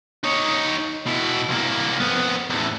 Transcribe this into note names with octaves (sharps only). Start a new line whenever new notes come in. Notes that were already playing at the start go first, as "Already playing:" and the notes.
D#4 C#5
B2 E4
C2 A#3
F2 B3
E2 A2